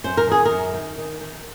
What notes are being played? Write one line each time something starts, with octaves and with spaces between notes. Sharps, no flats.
F#2 C5
A#4
D#3 G#4
A#4
F#2
D#3
D#3
D#3